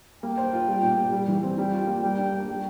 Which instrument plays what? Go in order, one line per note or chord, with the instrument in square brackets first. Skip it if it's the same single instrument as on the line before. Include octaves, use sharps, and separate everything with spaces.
[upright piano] A#3 [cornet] G5
[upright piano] C5
F4
G3
A#2
A#3
G3
E3
C4
[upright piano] G3 [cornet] G5
[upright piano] F4
A#3
[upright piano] G3 [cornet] G5
[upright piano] D4
A#3
G3